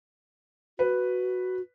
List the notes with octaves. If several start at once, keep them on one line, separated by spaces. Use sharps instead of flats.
F#4 B4